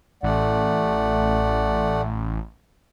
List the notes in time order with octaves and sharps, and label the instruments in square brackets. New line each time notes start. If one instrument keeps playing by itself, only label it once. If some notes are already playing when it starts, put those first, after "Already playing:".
[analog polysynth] A1 [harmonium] A3 D5 F#5